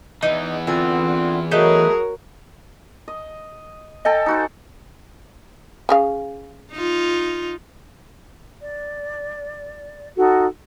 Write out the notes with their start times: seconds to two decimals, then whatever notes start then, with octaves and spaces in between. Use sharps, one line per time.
0.23 E2 E3 D#4
0.67 D3 B3 C4 F4 G#5
1.51 F#3 A3 D#4 F#4 G#4 A#4 B4 C#5
3.08 D#5
4.05 A4 D#5 G5 G#5
4.26 D#4 F#4 C5
5.89 C#3 G#4 F5
6.72 D#4 F4
8.61 D5
10.17 D#4 F#4 A4